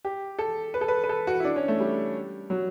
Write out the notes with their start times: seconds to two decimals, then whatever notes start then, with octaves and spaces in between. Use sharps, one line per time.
0.05 G4
0.39 A4
0.74 B4
0.81 A4
0.88 B4
1.04 B4
1.09 A4
1.27 F#4
1.40 E4
1.45 D4
1.56 C#4
1.68 A3
1.80 G3
2.50 F#3